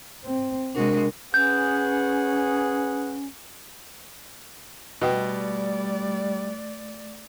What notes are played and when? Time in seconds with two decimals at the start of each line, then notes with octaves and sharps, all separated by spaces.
0.24 C4
0.75 C3 G#3 D4 F#4 A#4
1.34 C#4 G#4 B4 F#5 G6
5.01 B2 G3 A3 D5 D#5 F#5 G5